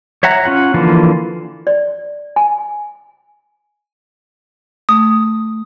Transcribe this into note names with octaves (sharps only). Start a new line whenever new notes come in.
C#5 E5 F#5 A#5
C#4 F4 F#5
D3 E3 F3 A#3 F4
D5
G#5
A3 D#6